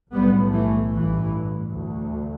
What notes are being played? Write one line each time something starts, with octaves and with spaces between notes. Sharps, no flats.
B1 A2 G3 B3
E3 A3
A1 G2 E3
D2